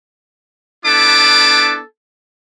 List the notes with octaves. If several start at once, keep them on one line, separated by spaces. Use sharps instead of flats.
B3 D4 E4 A4 D6